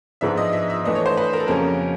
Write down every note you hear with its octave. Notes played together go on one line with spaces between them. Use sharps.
G#2 F3 G#3 B3 D4 E5
D#5
E5
E5
E3 A3 D4 D#5
C#5
C5
B4
A#4
A4
F2 C#3 F#3 A#3 C#4 A#4